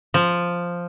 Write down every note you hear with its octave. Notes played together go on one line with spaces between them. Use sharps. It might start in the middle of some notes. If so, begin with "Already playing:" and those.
F3